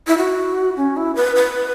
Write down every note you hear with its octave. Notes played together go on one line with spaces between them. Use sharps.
E4
F#4
C#4
E4
B4
B4